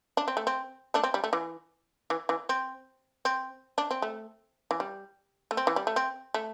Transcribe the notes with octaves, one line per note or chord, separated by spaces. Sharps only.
D4
C4
A3
C4
A3 D4
C4
G3
A3
E3
E3
E3
C4
C4
D4
C4
A3
E3
G3
A3
C4
E3
G3
A3
C4
A3